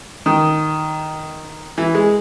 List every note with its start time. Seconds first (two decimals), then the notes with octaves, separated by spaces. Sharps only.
0.26 D#3
1.78 E3
1.95 G#3